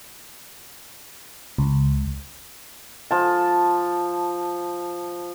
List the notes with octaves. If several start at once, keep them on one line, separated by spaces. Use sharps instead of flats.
C#2
F3 A5